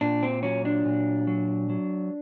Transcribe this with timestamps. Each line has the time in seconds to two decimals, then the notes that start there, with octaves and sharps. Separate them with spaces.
0.01 A#2 D4
0.23 C4
0.43 F#3 C#4
0.65 D4
0.85 A#2
1.27 F#3
1.70 F#3